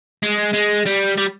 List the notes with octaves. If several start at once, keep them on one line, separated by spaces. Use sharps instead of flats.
G#3
G#3
G3
G3